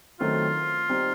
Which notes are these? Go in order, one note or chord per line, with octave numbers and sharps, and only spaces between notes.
D#3 F#3 A3 C4 F4
G3 C4 D#4